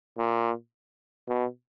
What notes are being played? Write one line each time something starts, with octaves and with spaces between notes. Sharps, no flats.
A#2
B2